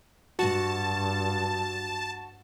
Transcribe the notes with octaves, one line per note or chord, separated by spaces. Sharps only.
G2 F#4 A5